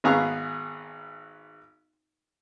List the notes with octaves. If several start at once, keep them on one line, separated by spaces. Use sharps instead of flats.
G#1 B3 G#4 F5 A#5 C#6